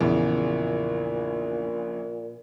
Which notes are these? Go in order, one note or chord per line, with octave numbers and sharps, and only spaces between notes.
A#1 E2 A#2 C#3